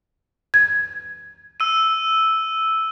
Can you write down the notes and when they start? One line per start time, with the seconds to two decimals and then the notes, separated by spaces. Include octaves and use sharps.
0.54 G#6
1.60 E6 D#7